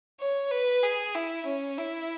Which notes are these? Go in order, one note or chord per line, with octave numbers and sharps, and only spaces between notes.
C#5
B4
G#4
E4
C#4
E4